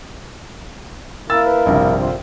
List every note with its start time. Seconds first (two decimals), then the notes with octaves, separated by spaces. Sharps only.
1.30 A#3 E4 A#4 E6 A6
1.46 B4
1.66 A#1 G2 C3
2.00 D3 F4 C5